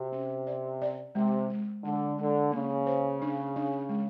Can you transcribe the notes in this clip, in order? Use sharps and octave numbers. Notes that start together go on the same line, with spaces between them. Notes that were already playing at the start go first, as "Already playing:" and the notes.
Already playing: C3 F#4
C#4
D5
D5
C3 G#3
G#3
D3 G#3
D3 G#3
C#3 A#3
C5
D4
D4
G#3